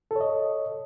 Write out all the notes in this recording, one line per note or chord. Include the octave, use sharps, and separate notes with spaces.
A4 C#5 D#5